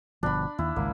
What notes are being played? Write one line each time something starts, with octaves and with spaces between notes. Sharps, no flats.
G1 B2 F3 D4 B5
D#2 E4
G#1 C#2 A#3